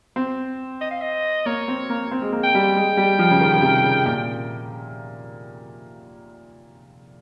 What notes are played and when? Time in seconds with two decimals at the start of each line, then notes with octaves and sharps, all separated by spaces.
0.16 C4
0.81 D#5
0.91 F5
1.02 D#5
1.46 A#3 C#5
1.68 C4
1.89 A#3
2.11 C4
2.22 G#3
2.32 A#3
2.44 G5
2.55 G3
2.76 G#3
2.97 G3
3.19 F3
3.31 C#3
3.40 D#3
3.55 C#3
3.62 C3
3.84 C#3
4.06 A#2 G5